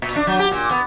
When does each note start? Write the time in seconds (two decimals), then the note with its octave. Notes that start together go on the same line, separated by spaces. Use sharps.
0.02 A#2
0.16 D4
0.27 F#3
0.39 G4
0.51 A#2
0.71 B3